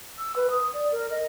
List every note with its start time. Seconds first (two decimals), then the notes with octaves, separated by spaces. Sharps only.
0.18 E6
0.36 B4
0.50 D#6
0.73 D5
0.91 A#4
1.10 D#5